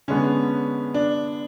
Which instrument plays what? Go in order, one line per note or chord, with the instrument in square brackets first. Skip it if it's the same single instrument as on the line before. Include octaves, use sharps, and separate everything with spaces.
[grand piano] D3 G#3 B3 [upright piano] C#4
[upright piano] D4